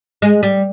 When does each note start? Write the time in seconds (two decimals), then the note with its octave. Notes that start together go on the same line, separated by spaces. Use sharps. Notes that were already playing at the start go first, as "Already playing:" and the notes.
0.22 G#3
0.43 G3